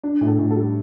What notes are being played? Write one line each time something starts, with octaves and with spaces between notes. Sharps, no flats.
D4
A2
A4
A2
A4
G3